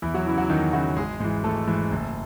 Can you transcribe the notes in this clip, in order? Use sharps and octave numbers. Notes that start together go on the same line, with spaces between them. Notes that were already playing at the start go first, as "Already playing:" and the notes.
E2 E3 E4
F#3 F#4
C#3 E3 E4
F#3 F#4
E2 D#3 D#4
C#3 E3 F#3 F#4
G#1 G#3 G#4
G#2 E3
G#1 A3 A4
G#2 E3
F#1